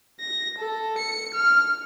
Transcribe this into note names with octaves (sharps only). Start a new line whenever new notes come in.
A#6
A4
C#7
F6